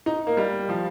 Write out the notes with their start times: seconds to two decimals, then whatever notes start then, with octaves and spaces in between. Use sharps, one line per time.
0.06 D#4
0.27 A#3
0.37 G3
0.69 F3